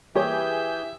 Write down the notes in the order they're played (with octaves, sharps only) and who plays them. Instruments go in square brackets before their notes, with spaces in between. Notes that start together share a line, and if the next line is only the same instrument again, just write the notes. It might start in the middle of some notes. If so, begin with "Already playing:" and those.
[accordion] E3 G#4 G6 [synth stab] G3 A#3 C#5 [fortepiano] G4 [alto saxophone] E5